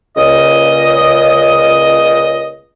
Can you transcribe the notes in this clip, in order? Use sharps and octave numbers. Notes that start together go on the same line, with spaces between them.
C#2 A#2 C#3 D#5